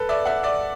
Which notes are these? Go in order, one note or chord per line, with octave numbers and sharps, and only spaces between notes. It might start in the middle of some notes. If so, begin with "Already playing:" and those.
Already playing: A4 B4
D5 E5
E5 F#5
D5 E5